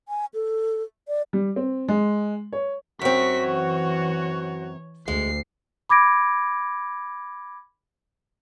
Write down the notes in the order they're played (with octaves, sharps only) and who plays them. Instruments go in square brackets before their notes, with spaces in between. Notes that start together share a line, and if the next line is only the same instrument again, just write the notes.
[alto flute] G#5
A4
D5
[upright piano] G3
C4
G#3
C#5
[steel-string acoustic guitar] F#2 C4 [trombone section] F#4 [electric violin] C#6 B6
[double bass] E3 [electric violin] C#5
[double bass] D2 [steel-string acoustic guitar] G#3 [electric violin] C7
[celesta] B5 D6 G#6 A#6 D7